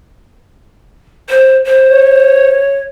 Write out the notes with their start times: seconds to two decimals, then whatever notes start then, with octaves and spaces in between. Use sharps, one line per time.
1.29 C5
1.65 C5
1.89 C#5